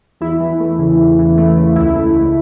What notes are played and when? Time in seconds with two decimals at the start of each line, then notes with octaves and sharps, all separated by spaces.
0.21 E2 E4
0.40 E3
0.60 A3
0.79 C#3
0.99 E2
1.19 E3
1.38 A3
1.57 C#3
1.76 C#2 E4
1.95 A3
2.16 C#2